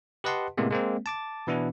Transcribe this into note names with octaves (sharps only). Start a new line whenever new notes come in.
G4 B4 D#5 F#5 A5 C6
A2 C3 G#3 A#3 B3
G#3 A#3 C4
A5 D6 A6
B2 E3 B3 D4 E4